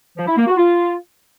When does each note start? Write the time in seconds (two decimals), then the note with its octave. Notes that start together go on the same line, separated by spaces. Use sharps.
0.17 F3
0.27 E4
0.37 A#3
0.47 F#4
0.57 F4